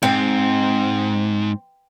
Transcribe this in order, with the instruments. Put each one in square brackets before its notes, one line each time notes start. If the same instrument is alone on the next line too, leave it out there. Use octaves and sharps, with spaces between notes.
[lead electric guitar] G#2 [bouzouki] C4